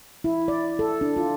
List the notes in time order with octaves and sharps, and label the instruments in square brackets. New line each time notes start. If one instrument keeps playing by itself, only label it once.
[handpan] E4
D5
A4
D4
F4